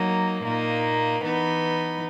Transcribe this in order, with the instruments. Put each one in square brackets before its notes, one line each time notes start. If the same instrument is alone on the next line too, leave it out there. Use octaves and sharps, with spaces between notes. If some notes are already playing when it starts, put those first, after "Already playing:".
Already playing: [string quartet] F#3 A#3 D#4
A#2 A#3 D#4
E3 B3 D#4